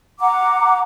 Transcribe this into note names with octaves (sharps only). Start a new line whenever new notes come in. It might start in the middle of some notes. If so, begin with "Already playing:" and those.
F#5 A#5 D6